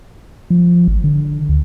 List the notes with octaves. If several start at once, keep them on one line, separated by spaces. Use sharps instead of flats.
F3
G#1
D3
D2